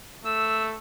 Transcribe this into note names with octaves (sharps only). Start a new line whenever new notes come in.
A3 E6